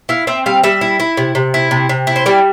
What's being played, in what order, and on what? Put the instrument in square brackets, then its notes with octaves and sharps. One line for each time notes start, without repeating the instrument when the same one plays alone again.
[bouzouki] E4 F5
C4 E5
G3 F5
G3 E5
E4
E4
C3
C3
E4
C3
C3
E4
C5
G3 D5